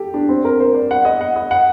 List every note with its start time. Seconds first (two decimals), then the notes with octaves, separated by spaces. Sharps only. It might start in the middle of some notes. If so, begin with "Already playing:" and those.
Already playing: G4 A4
0.14 D4
0.29 C4
0.45 A#4
0.60 C5
0.74 D5
0.91 F#5
1.05 D#5
1.21 F#5
1.36 D#5
1.51 F#5